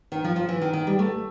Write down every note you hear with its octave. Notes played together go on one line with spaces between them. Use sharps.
D#3
F3
F3
E3
D#3
D#3
G3
A3